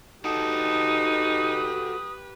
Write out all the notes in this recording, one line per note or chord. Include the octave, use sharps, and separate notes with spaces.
D#4 F#4 G4 A4 B4 D#6